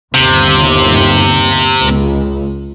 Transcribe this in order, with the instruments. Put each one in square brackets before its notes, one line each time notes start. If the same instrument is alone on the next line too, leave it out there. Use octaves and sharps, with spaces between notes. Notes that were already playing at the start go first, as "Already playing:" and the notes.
[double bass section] G1 D#2 [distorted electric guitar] C3
[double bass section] C#2